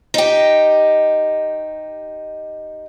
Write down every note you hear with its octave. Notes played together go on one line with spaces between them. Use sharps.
D#4 G4